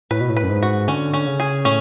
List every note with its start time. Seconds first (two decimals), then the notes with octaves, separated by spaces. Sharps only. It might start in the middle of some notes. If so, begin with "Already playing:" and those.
0.11 A2 B4
0.21 B2
0.29 A2
0.37 B4
0.43 F#2
0.49 G#2
0.63 F#4
0.88 D3 C#4
1.14 C#4
1.27 C#3
1.40 G#4
1.65 A2 C#4